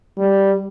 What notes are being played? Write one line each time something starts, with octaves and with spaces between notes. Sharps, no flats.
G3